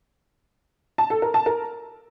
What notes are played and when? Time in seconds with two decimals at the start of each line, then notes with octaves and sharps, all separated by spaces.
0.98 A5
1.10 A4
1.22 A#4
1.34 A5
1.46 A#4